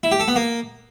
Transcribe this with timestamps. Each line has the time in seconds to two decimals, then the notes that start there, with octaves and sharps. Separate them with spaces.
0.03 E4
0.12 G4
0.20 A4
0.28 B3
0.36 A#3